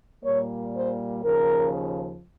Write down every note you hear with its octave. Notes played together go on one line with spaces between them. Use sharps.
A#2 G3 A#3 C#5
C5
D#2 C#3 F3 A#4